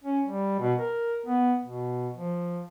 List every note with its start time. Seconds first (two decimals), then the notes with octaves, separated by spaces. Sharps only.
0.04 C#4
0.25 G3
0.60 B2
0.78 A#4
1.26 B3
1.64 B2
2.15 F3